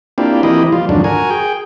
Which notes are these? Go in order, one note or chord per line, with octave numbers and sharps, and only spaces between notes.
A#3 C4 D4 E4 F4 G4
E3 A#3 C4 E4 G4 D#5
F3 G3 F4
F2 G#2 D3 D#3 F#3 D4
F#4 A#4 G#5
G#4 G5